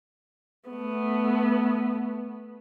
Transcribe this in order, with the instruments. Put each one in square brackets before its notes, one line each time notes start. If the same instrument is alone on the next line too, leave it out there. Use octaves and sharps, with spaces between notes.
[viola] A3 B3